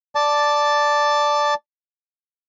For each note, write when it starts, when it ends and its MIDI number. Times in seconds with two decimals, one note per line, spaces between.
0.15 1.54 74
0.15 1.54 81